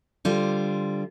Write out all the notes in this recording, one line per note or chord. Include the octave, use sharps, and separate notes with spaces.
D3 G3 F4 C5